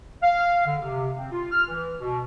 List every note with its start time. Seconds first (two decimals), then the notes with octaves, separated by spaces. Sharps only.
0.22 F5
0.66 D3
0.82 C3
1.17 C4
1.32 F4
1.52 F6
1.68 E3
2.01 B2